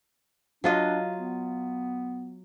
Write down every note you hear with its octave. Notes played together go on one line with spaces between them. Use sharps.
F#3 D4 F4 D#5
B3